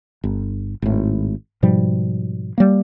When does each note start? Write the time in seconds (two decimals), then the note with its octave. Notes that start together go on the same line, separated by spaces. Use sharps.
0.24 G1
0.82 G#1 A2
1.63 G#2 B2 F3 G3
2.58 G3 A#3